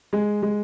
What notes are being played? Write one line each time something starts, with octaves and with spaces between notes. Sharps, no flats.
G#3
G#3